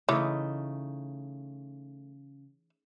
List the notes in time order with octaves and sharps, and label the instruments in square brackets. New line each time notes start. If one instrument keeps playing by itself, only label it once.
[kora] C#3 A3 D#4 [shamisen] E3